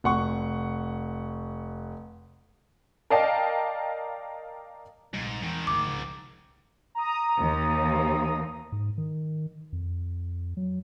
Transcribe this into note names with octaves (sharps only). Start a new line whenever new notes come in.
F1 F#5 C#6
A#4 D5 D#5 F5 G5 A5
A#1 G#2 C3 G3
E2 G#2 D#3
G#1 D2 D6
C2 C#3 F3
A#5 D#6
D#2
G#2
D#3
F2
F#3